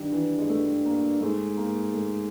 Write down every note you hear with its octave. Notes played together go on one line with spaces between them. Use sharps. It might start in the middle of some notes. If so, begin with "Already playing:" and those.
Already playing: G2 D#3
E3
G#3
A3
A#3
G#2 A3
A#3
A3